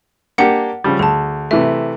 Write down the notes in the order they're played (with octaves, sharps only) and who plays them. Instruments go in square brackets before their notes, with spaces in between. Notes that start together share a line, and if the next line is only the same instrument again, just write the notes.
[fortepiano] A#3 D4 G4 [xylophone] F#5 C#7
[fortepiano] C#3 F3 G3
[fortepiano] D2 [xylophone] G#4 A5
[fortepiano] C3 E3 A3 [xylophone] E5